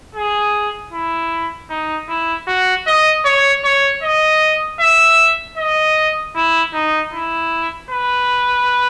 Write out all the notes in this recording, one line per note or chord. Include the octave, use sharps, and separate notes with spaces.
G#4
E4
D#4
E4
F#4
D#5
C#5
C#5
D#5
E5
D#5
E4
D#4
E4
B4